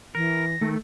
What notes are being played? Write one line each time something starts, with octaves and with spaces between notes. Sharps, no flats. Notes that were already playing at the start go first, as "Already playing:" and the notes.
E3 A#4 A#6
D#3 A3